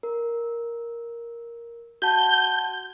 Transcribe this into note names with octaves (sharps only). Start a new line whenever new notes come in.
A#4
F#4 F#5 A5 G6